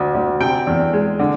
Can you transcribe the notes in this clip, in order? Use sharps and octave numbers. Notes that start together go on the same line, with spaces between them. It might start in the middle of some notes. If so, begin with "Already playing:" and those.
Already playing: D2
D2
C3 G5
E2
G#3
D3